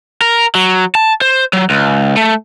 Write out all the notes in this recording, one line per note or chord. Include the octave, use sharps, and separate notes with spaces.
A#4
F#3
A5
C5
F#3
C#2
A3